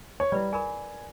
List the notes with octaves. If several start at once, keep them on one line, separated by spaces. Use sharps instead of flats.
C#5
G3 E4 B4 D5
G#4 A#4 G#5 B5